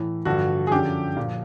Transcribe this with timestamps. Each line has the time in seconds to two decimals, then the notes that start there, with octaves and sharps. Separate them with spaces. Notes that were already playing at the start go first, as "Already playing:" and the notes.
Already playing: A2 E3
0.25 G2 D3 F3 F#4
0.67 G#4
0.71 F#2 D3 F3 G4
1.16 A#2 F3